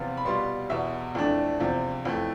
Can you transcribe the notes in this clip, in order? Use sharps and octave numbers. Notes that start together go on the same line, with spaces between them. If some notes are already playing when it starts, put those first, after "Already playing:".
Already playing: E2 C3 F3 B3 F4
B5
B2 G3 B3 F4 C6
E2 B2 B3 E5
F2 E3 A3 D4
E2 C3 F3
F2 E3 A3